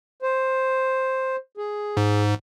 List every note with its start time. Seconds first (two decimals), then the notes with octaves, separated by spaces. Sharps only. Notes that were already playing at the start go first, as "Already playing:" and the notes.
0.22 C5
1.58 G#4
1.97 G#2